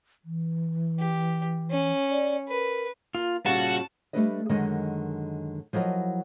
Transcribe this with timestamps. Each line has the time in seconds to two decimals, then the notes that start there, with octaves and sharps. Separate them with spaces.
0.25 E3
1.00 G4
1.71 C#4
2.11 D5
2.48 A#4 B4
3.15 A#3 F4
3.46 A#2 C#3 G3 F#4 A5
4.13 G3 A3 D4 E4 B4 D#5
4.49 F#2 D3 D#3 G#3 D#5
5.73 F3 F#3 E4 A#4 D#5